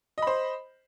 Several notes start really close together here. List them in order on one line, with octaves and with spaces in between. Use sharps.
D#5 B5 C5